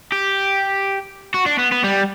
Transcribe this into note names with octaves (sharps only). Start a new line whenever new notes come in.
G4
F#4
D4
B3
B3
G3